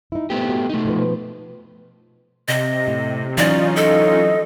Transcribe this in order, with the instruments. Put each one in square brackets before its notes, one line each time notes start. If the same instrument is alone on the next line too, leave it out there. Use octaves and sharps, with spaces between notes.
[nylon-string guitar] D#4 E4
[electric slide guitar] A3 B3 G4 [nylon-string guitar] C4
[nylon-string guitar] F#4
[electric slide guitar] A3 D#4
[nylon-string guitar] B2 F3 B4
[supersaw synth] C3 [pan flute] D#5
[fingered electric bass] A2
[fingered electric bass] E3 F#3 [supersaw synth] C#4 D#4 F4 [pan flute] D5
[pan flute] A4 [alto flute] D#5